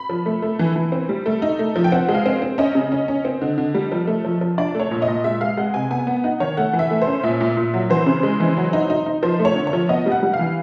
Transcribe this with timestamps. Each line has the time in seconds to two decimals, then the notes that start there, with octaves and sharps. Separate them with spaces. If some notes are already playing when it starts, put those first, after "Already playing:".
Already playing: B5
0.09 F3
0.26 A3
0.42 A3
0.59 E3
0.76 E3
0.92 C4
1.09 G3
1.26 A3
1.42 D#4
1.59 A3
1.76 F3
1.84 G5
1.92 C4 F#5
2.09 G#3
2.14 F5
2.26 C4
2.42 C4
2.58 C#4 D#5
2.75 C#3
2.92 C#4
3.08 C#4
3.25 C4
3.42 D3
3.58 D3
3.75 G3
3.92 F3
4.07 A3
4.25 F3
4.41 F3
4.58 D4 D5
4.75 A3 C#5
4.91 A#2
5.02 D#5
5.08 A#2
5.24 G#3 E5
5.41 G#3 F5
5.57 G#3 F#5
5.74 C3 G#5
5.91 B3 G#5
6.07 B3
6.24 D#4 F#5
6.40 D#3 C#5
6.57 A3 F#5
6.73 E3
6.79 E5
6.91 A3
7.02 C5
7.07 C#4
7.23 A#2 E5
7.40 A#2
7.57 A#2
7.74 F#3
7.90 E3 C5
8.06 C#3
8.23 G#3
8.40 E3
8.57 F#3
8.73 D#4
8.90 D#4
9.06 D#4
9.23 F3 C5
9.39 A3
9.45 C#5
9.56 D3
9.67 C#5
9.73 F3
9.89 B3 D#5
10.06 G3
10.12 F#5
10.23 G3
10.34 F5
10.39 E3